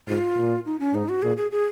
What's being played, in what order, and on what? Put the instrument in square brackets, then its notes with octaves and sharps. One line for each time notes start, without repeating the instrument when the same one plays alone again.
[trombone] G#2 [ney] F4
[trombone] A#2
[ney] D#4
C#4
[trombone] G#2 [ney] D#4
[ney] F#4
[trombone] A#2 [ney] G#4
[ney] G#4
G#4